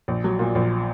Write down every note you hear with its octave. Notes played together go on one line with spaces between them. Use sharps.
A#1
F#3
A#2
A#1